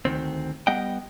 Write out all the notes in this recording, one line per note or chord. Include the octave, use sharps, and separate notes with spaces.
D2 D#3 C4
G3 B3 D#5 F#5 G5